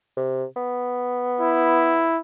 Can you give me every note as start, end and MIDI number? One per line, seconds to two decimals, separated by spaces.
0.17 0.45 48
0.56 2.13 59
1.40 2.20 64